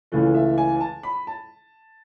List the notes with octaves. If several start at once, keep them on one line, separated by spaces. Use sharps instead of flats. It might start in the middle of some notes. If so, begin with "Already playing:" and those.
C#2 C#3 E3 A3
E5
G#5
G#5
A5
B5
A5